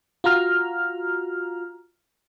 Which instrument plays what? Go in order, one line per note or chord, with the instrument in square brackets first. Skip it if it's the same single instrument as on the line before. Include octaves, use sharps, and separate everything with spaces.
[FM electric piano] F4 F#4 A#5 F6